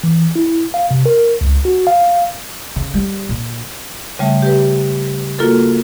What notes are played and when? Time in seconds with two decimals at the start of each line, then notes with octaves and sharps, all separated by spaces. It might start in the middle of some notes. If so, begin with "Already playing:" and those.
0.04 E3
0.36 E4
0.74 F5
0.91 C3
1.06 A#4
1.41 C#2
1.65 F#4
1.87 F5
2.76 C#3
2.94 G3
3.29 A#2
4.19 C#3 G3 A3 E5
4.42 G4 B4
5.39 A#3 F4 F#4 A4 A#4